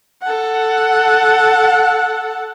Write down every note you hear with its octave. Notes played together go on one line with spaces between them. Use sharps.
A4 F#5